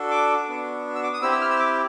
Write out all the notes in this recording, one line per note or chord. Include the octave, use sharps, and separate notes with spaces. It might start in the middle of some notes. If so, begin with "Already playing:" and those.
Already playing: D4 F#4 A4
D6
B3 D4 F#4
E6
D6
D#6
C4 E4 G4 E6
E6
F6
E6
D6